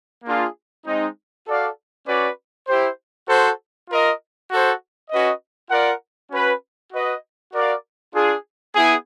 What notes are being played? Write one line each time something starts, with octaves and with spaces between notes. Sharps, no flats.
A#3 D4 F4 G#4
G#3 C4 D#4
F#4 A4 D5 F5
C#4 F#4 B4 D5
E4 G4 C5
F#4 A4 C5
F4 A#4 D#5
F#4 A4 C5
C#4 F#4 B4 D#5
F4 A#4 D5 F#5
C#4 F#4 B4
F#4 B4 D#5
F#4 A#4 D5 F5
D4 F4 G#4
B3 E4 G#4